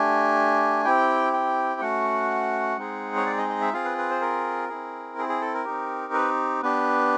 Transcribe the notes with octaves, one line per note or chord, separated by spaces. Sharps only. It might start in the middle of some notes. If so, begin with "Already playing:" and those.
Already playing: A3 D4 G4 G#5
C4 E4 G4 G5
G5
A3 C#4 F#4 F#5
G#3 C4 D#4 G#4
C#5
D5
D#5
D#5
E5
C4 F4 G#4 F5
B4
B4
C5
A#4
C4 E4 G#4
G#4
G#4
A4
A#4
C4 D#4 G4
B4
B3 D4 G4 B4